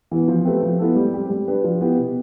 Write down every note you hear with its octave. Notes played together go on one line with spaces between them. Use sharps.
E3 B3
F3
A3 C4 G4 B4
F3
B3 E4 A4
G3
C4 G4
G3
D4 G4 B4
F3
B3 E4 G4 B4
B2